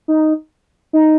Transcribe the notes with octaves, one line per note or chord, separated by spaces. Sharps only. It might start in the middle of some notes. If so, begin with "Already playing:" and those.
D#4
D#4